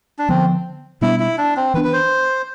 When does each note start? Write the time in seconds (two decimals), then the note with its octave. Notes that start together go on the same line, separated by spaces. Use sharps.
0.18 D4
0.29 D3 F3 B3 C4
1.01 B2 G3 B3 D4 E4
1.20 E4
1.38 D4
1.57 C4
1.74 E3 B3 D4 B4
1.84 B4
1.93 C5